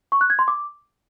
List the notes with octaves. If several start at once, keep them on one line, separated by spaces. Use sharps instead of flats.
C#6
F#6
G#6
C6
D6